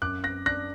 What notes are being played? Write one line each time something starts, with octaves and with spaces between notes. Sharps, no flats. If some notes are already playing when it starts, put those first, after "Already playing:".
F#2 D6 F#6
F#6 A#6
D4 F#6 A#6